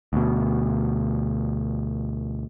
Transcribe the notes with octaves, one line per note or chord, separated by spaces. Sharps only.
D2 B2